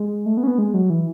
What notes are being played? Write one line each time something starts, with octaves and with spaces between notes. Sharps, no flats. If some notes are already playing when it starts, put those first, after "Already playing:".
Already playing: G#3
A3
B3
C#4
B3
G#3
F#3
E3